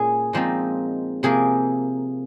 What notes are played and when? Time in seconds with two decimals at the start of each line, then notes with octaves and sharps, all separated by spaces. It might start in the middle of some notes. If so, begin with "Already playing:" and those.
Already playing: A#2 C#4 G#4
0.33 A#2 F3 G#3 C4 D#4
1.23 C3 F3 A#3 G#4